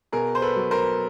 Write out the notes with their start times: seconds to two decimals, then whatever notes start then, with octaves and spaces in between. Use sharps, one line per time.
0.12 B2 G#4 A#4
0.35 C5
0.42 A4 B4
0.56 F#3
0.71 A#4 C5